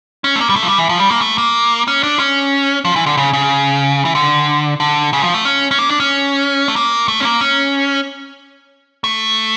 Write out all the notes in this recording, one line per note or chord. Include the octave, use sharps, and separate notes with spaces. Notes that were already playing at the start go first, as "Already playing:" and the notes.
C#4
A3
A#3
G3
A3
F3
G3
E3
F3
G3
A#3
A3
A#3
C#4
D4
C#4
F3
E3
D3
C#3
C#3
E3
D3
D3
C#3
F3
A3
C#4
C#4
A#3
D4
C#4
A3
A#3
A3
C#4
A#3
C#4
A3